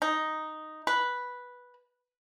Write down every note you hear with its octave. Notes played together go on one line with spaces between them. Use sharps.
D#4
B4